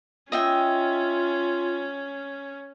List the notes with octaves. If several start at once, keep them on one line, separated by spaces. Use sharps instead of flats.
C#4 F4 D#5 E5 G5